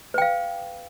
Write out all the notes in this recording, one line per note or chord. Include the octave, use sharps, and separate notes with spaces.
B4 F5 G5